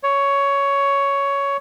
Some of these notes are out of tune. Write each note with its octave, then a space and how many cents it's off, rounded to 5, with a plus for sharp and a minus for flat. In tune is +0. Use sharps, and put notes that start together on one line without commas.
C#5 +10